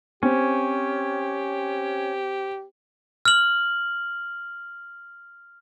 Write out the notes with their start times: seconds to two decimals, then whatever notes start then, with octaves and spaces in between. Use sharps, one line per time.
0.23 C4 C#4 G4
3.25 F6 F#7